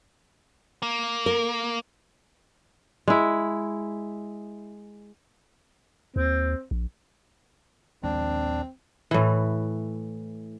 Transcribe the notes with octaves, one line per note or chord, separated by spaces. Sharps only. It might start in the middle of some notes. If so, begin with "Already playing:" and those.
A#3
A#4
G#3 E4
D#2 C4
A#1
A#1 D#2 G#3 C4 D4
A2 E3